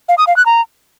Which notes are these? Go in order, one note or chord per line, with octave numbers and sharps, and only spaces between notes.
F5
D#6
F5
F#6
A#5